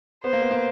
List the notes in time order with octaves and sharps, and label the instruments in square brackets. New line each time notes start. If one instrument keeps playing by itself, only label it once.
[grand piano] B3 [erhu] C5
[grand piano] A#3
B3
A#3